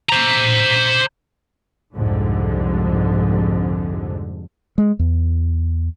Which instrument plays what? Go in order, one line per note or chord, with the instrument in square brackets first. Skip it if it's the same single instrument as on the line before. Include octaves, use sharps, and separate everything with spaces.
[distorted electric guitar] C5 A#5
[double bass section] C2 F2 G#2 D3
[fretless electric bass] G#3
E2